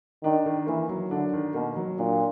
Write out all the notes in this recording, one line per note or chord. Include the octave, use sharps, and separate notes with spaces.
D#3 D4
D#3
E3 A#3
F#3
D3 D4
D#3
B2 A#3
F#3
A#2 D4